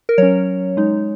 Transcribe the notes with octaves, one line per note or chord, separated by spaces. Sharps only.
A#4
F#3 C#4 C#5
G#3 D#4